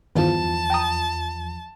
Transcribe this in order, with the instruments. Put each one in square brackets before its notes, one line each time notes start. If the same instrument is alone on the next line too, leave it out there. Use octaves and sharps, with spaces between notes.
[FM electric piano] E2 F3 [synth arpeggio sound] G2 D#3 B3 [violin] A5
[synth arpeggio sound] G5 A#5 D#6